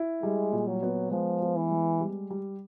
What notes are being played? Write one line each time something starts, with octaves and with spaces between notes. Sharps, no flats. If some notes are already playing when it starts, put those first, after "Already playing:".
Already playing: E4
G3 G#3
A#2
F#3
B3
F3 G#3
B3
E3
G#3
G3
G3